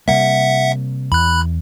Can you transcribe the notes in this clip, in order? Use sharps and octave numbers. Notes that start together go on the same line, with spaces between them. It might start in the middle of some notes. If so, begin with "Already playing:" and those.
C3 G3 A#3 E5 F#5
E2 B5 F#6